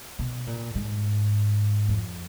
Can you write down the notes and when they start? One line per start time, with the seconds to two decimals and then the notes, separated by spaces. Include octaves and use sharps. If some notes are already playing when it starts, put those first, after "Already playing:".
0.19 B2
0.47 A#2
0.75 G#2
1.88 F2